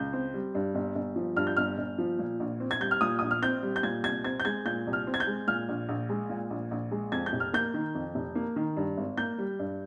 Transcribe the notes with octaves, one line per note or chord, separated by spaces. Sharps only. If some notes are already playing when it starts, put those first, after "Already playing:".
Already playing: C#2 G6
C4
G3
G2
G1
G1
F3
G2 F6
G6
G1 F6
G1
F3
A#2
A#1
C4
G#6
G3 G6
F6
A#2 D#6
A#1 D#6
F6
C4 G6
G3
G6
A#2 G#6
C2 G#6
C4 G#6
G6
G#3 G#6
A#2 G6
C2
F6
C4
G#6
G6
G#3
A#2 F6
A#1
A#1
G#3
A#2
A#1
A#1
G#3
F2 G#6
G6
F1
F6
A#3 G6
D#3
F2
F1
A#3
D#3
G2
G#1
A#3 G6
G3
G2